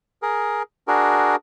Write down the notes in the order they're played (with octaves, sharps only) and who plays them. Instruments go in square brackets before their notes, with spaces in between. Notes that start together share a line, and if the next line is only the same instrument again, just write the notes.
[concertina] G#4 A#4
D4 F#4 G#4 A#4